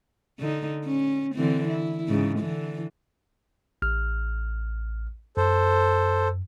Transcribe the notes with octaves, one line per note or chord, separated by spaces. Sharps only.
D3 D#4
C#4
D3 E3 C4
E4
G#2 C#3
D3 E3
A1 F6
F#2 A4 C5